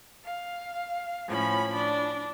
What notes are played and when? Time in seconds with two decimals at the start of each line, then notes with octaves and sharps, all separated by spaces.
0.24 F5
1.28 A2 F3 C#4 B5
1.74 D4